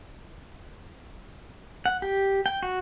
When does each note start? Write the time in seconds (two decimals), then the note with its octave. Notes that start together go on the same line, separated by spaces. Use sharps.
1.86 F#5
2.02 G4
2.46 G5
2.63 F#4